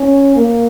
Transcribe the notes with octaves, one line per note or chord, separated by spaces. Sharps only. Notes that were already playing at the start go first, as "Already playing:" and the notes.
Already playing: C#4
A#3